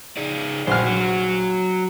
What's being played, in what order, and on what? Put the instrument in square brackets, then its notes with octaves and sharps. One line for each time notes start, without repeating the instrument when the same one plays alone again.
[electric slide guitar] D#4 G#4 D5
[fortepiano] A#1 F#4 F6 [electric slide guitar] G3 C5
[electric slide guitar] F#3